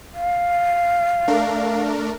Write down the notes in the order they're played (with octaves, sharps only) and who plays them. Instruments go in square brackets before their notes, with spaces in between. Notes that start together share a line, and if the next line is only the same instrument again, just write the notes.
[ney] F5
[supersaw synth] A3 D4 A#4